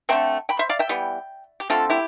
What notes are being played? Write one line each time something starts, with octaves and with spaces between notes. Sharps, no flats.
D3 A3 C4 E5 G5
G5 B5
C5 E5
D5 F5
E5 G5
E3 G3 B3
G4
D3 A3 C4 F4 A4
E4 G4